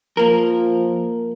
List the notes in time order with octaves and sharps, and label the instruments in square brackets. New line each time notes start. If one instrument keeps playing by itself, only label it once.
[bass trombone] F3 [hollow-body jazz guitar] A#3 A#4